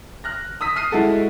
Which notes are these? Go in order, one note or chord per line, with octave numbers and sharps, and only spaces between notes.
F6 F#6 A#6
D#6 E6 B6 D#7
D#6 F6 C7 D#7
G#3 E4 F#4 A4